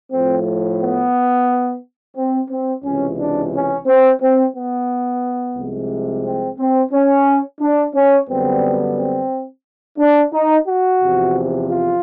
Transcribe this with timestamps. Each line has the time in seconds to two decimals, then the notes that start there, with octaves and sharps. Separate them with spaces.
0.12 A2 F3 A3 C4
0.81 B3
2.17 C4
2.50 C4
2.84 C#2 C3 E3 C#4
3.18 D4
3.53 C#4
3.87 C4
4.21 C4
4.55 B3
5.56 C2 C3 F3 G#3
6.25 C4
6.58 C4
6.92 C#4
7.60 D4
7.94 C#4
8.28 F#2 D3 G3 B3 C4
8.97 C4
9.98 D4
10.33 D#4
10.67 F#4
11.01 E2 C3 F3
11.69 F4